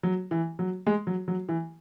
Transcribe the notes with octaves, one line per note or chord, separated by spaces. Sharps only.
F#3
E3
F#3
G#3
F#3
F#3
E3